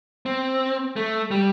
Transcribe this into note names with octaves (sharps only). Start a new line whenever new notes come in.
C4
A3
G3